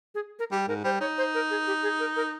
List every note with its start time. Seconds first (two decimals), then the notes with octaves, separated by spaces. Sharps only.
0.15 G#4
0.39 A#4
0.51 G3 G4
0.68 G#2 A#4
0.84 G3 C5
1.00 D#4 C#5
1.18 C5
1.34 A#4
1.50 G#4
1.67 G4
1.83 G#4
2.00 A#4
2.16 A#4